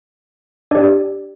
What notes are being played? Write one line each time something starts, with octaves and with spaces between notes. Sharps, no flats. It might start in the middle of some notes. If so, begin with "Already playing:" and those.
D4 G4 D5